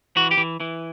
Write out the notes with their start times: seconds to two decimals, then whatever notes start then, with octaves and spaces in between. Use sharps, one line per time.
0.16 E3 F#4
0.31 G4
0.38 E3
0.60 E3